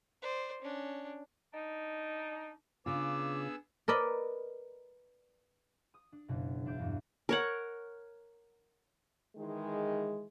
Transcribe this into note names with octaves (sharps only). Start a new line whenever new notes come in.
C5 D5
C#4 D4
D4 D#4
C#3 B3 D4 F4 G#4 D6 E6
A#4 B4 D5 D#5 B5
D#6
D4
F#1 B2
E1 D4 E5 F5 D6 G6
E2 G2
A#4 C#5 F#5
D#3 E3 G#3